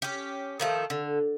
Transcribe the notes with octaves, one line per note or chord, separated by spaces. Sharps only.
C#4 G4
D#3 F3 A3
D3